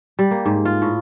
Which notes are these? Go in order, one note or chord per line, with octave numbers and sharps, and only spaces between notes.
G3
A#3
G#2
F4
A2